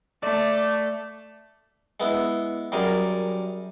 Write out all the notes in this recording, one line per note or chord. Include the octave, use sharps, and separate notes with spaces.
A3 D5 D6
G#3 B3 E4
F#2 G3 G#4 A#4